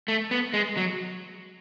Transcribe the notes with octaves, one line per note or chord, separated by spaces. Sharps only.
A3
B3
G#3
F#3